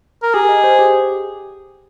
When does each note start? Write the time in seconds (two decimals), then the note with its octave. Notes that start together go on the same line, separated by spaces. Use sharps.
0.23 A#4
0.34 G4 G#4
0.49 D#5
0.64 C5
0.79 G4